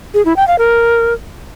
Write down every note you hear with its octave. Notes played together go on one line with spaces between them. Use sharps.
G#4
E4
G5
F5
A#4